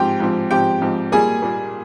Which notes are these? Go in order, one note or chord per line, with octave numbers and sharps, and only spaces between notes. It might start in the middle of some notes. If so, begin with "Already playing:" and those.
Already playing: G#2 F3 C4 G4 G5
G#2 F3 C4
G#2 F3 C4 G4 G5
G#2 F3 C4
A#2 G3 A#3 G#4 G#5
A#2 G3 A#3